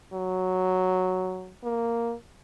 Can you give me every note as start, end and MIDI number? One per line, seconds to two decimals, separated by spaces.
0.13 1.53 54
1.64 2.13 58